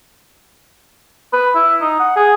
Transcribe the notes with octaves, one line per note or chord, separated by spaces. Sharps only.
B4
E4
D#4
F#5
G#4